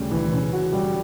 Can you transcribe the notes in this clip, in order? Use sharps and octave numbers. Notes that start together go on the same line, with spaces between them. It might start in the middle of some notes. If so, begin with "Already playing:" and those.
Already playing: D2 C#3 G3
E3
C#3
F#4
G3